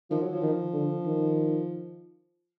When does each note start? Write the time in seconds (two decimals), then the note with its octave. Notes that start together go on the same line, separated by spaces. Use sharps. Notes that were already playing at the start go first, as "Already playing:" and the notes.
0.10 D#3 F3
0.21 F#3
0.33 F3
0.42 D#3
0.73 D3
1.06 D#3